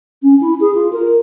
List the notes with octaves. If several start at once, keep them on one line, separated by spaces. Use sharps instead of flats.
C#4
E4
G#4
F4
A#4